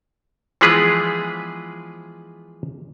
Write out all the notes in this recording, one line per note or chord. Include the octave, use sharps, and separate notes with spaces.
E3 F3 G#3 B3 G#4 B4